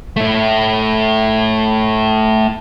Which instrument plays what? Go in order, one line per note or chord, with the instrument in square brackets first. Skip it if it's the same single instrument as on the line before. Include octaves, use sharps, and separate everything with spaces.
[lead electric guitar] A3 E4